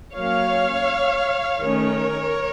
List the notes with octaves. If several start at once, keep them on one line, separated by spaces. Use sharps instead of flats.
F#3 A#3 C#4 C#5 F5
D#3 A3 C#4 A#4 C#5